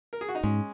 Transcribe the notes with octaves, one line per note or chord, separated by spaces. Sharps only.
A#4
G#4
F#4
D#4
G#2 G#3 C#4